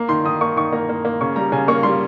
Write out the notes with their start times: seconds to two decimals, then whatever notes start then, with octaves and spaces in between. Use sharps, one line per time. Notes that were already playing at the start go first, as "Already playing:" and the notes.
Already playing: A#3
0.09 D#3 C6
0.24 D#3 D#6
0.41 A#3 C#6
0.56 D#3 C#6
0.72 A#3 A#5
0.89 A#3
1.05 A#3
1.21 C#3 C#6
1.36 G3 A#5
1.52 C#3 G#5
1.68 A#3 C#6
1.83 G3 C6